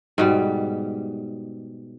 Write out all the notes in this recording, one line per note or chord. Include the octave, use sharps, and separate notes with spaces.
G#2 B2 G3